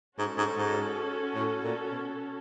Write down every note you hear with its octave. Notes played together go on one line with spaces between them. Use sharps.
G#2 C#4 F#4 A4
G#2
G#2
A2
A#2
B2